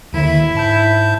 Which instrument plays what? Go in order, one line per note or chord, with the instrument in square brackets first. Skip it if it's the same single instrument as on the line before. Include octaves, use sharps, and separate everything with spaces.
[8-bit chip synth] D#2 D3 D#3 [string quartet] E4
[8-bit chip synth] G#2 A5 G6